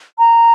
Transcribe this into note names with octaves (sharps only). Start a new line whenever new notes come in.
A#5